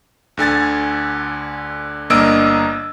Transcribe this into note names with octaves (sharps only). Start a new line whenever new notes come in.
D2 D3 G#5 A6
G1 A#3 D4 D#5 E6 D7